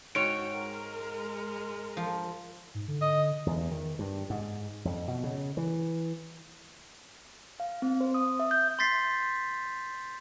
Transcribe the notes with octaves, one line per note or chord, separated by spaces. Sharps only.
G#2 F#4 C#5 G5 D7
G#3 A#4
F3
G#2
D3
D#5
E2
D#3
G2
G#2
F2
B2
C#3
E3
F5
C4
C5
D#6
E5
G6
C6 G6 A6 B6 C7